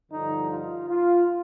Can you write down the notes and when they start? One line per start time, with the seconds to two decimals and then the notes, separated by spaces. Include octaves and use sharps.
0.12 G2 D3 F3 D#4
0.50 F4
0.89 F4